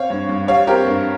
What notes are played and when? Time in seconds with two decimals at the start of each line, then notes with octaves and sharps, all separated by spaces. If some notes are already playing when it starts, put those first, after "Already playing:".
Already playing: C4 C#5 F5
0.10 G2
0.29 G2
0.48 G3 C#5 F5
0.67 C4 G4 A#4
0.87 G2